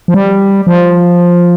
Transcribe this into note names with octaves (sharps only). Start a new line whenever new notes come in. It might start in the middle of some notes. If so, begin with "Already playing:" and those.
F3
G3
F3